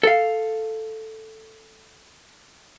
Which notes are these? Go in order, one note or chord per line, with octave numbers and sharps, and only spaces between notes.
A4 F5